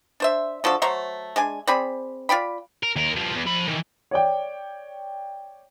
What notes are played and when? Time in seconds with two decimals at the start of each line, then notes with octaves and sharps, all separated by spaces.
0.20 D4 C5 E5
0.64 D3 F3 F#4 A4
0.82 F#3 A3 C5 A#5
1.36 G#3 D4 G#5
1.67 C4 G#4 D5 B5
2.29 F4 D5 G5 B5
2.83 A#4
2.96 D#2 A#4
3.16 G2 F3
3.34 E2
3.46 F3 B5
3.68 D#3 E3
4.11 C#5 D5 G5